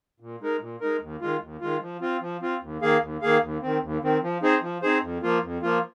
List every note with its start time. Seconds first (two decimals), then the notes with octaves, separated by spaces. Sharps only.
0.20 A#2
0.41 G#3 D#4 A#4
0.60 A#2
0.81 G#3 D#4 A#4
1.00 D#2
1.21 D#3 G#3 F4
1.41 D#2
1.61 D#3 G#3 F4
1.81 F3
2.01 C4 F4
2.21 F3
2.41 C4 F4
2.62 D#2
2.81 D#3 A#3 G#4 F5
3.01 D#2
3.21 D#3 A#3 G#4 F5
3.42 D#2
3.62 D#3 C4
3.82 D#2
4.02 D#3 C4
4.22 F3
4.42 C4 D#4 G#4 C5
4.62 F3
4.82 C4 D#4 G#4 C5
5.02 F2
5.22 F3 A#3 F4
5.42 F2
5.62 F3 A#3 F4